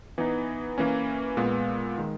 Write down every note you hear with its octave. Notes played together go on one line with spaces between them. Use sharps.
E3 B3 D#4
E3 A#3 C#4
A#2 G#3 B3
D#3 G#3